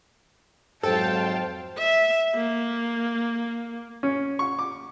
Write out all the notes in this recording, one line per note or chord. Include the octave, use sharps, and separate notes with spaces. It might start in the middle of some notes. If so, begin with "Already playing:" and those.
F2 G#2 F#3 A4 C5 F5 G5 A5
E5
A#3
C#4
C#6
D6